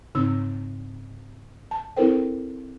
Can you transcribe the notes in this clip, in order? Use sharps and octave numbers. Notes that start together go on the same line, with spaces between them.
G#2 C#3 C4 D#4 E6
A5
C4 E4 A4 A#4 C5 G5